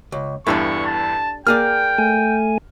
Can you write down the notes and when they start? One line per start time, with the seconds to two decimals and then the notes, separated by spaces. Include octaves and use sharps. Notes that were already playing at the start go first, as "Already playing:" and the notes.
0.12 C#2
0.47 E2 G2 D4 E4 G4 A4 C#6
0.86 A5
1.47 A#3 G#4 D5 G5 F6
1.98 A3 G#5